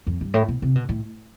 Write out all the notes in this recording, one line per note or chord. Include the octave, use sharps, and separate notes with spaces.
F2
G2
A2
B2
C3
B2
A2